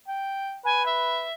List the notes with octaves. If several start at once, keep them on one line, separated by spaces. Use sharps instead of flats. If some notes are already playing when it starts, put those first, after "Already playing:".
G5
B4 G#5
E5